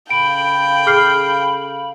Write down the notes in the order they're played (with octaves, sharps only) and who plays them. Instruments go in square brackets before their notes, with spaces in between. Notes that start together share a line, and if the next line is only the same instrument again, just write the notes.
[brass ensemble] C#3 A4 F5 [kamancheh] G5 [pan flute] B5 [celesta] D7
[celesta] G#4 F6 C7